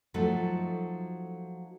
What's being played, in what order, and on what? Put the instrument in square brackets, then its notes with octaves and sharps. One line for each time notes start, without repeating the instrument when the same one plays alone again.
[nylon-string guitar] F3 F#3 A3 D#4 A4